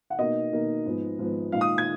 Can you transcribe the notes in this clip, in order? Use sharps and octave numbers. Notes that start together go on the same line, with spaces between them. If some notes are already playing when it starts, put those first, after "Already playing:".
F#5
B2 A#3 D#4 D#5
B2 A#3 D#4
G#2 F3 B3
G#2 F3 B3
A#2 G#3 D#4 F5
D#6
G#6